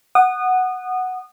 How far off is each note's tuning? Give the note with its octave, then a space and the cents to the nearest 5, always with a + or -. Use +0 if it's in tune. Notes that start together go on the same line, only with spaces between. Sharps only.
F#5 +0 D#6 -25